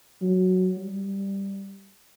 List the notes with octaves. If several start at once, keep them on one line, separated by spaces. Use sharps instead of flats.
F#3
G3